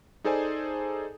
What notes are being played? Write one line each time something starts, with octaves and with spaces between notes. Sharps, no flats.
D#4 G#4 A4 C5 D5 G#5